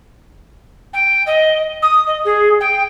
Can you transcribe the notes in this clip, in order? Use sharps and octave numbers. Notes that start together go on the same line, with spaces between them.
G5
D#5
D#6
D#5
G#4
G5